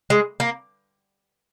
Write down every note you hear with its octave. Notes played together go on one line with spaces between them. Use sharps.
G#3
A#3